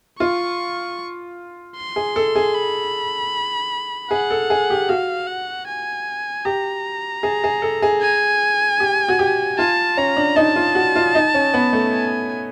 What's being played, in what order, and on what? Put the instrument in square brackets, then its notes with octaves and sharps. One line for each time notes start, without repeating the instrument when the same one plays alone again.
[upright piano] F4 [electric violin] C#6
[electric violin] C6
[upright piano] G#4
A4
G#4
[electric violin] B5
[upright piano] G#4 [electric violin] F#5
[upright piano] A4
G#4
G4
[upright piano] F#4 [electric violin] F5
[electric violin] F#5
G#5
[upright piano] G4 [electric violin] A#5
[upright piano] G#4
G#4
A4
G#4
[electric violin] G#5
[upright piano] G4
F#4
G4
[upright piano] F4 [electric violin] A5
[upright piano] C#4 [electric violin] A#5
[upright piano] D4
[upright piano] D#4 [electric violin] A5
[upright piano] F4
F#4
F4
D#4
C#4
B3
A3
[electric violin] G#5